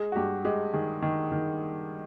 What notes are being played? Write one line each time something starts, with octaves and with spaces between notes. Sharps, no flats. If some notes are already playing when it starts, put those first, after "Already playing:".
Already playing: G#3 G#4
F#4
G2 G4
G#3 G4
D#3 G#4
D#3
D#3